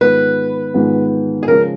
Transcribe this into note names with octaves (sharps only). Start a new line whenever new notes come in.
G#2 D#3 G#3 B3 F4 B4
G#2 D#3 G#3 B3 F4
G#4
C#3 F3 G#3 C#4 A#4